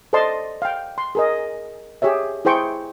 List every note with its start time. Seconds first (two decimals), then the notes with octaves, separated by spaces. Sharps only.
0.13 A4 C5 D5 D#5 A5 C6
0.62 F5 G5
0.98 C6
1.15 G#4 A#4 D#5
2.02 G4 G#4 C#5 E5
2.45 E4 G#4 C5 G5 C#6